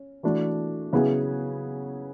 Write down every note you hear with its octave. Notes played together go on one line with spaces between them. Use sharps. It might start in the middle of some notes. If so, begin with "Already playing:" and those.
Already playing: C#4
E3 A3 D4 F#4
C#3 F#3 B3 E4 G#4